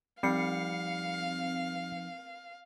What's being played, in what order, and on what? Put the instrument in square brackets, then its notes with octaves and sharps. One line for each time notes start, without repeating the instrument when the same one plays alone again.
[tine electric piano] F3 D#4 [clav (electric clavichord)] G3 [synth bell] C4 C7 C#7 [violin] F5